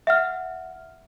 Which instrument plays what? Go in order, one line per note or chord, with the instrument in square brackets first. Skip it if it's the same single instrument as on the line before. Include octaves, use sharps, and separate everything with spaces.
[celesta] E5 F#5 F6